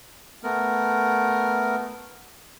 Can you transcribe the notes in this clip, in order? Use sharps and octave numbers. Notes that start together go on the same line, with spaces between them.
A3 B3 A#4